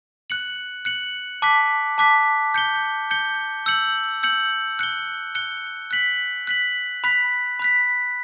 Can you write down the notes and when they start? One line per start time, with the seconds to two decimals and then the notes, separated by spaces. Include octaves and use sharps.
0.30 F#6 C#7 F#7
0.85 F#6 C#7 F#7
1.42 A5 D6 F#6 B6
1.98 A5 D6 F#6 B6
2.54 G6 C#7 G7
3.11 G6 C#7 G7
3.66 E6 G6 C#7 F#7
4.23 E6 G6 C#7 F#7
4.79 F#6 C#7 G7
5.35 F#6 C#7 G7
5.91 F#6 B6 F#7
6.47 F#6 B6 F#7
7.04 B5 F#6 B6
7.59 B5 F#6 B6